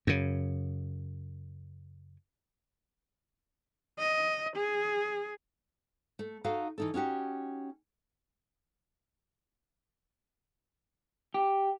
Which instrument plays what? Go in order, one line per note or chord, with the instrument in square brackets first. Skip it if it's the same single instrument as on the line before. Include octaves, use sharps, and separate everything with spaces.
[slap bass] F#2 C#3
[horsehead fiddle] D#5
G#4
[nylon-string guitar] A3
D#4 F#4 A4 F5
E3 D#4 A4
C#4 D#4 F#4 G4
[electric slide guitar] G4